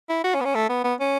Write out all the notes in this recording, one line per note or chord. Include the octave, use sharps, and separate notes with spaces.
E4
F#4
C#4
B3
C#4
A3
B3
B3
C#4